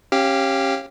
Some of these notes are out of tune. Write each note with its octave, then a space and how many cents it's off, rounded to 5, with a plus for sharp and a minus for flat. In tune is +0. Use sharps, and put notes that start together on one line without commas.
C#4 -25 G4 +0 F5 -10